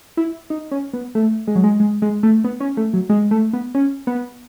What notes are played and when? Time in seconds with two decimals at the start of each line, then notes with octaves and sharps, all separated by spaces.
0.17 E4
0.50 D#4
0.71 C#4
0.93 B3
1.15 A3
1.47 G#3
1.55 F#3
1.64 G#3
1.80 G#3
2.02 G#3
2.23 A3
2.44 B3
2.60 C#4
2.77 A3
2.93 F#3
3.09 G#3
3.31 A3
3.53 B3
3.75 C#4
4.07 B3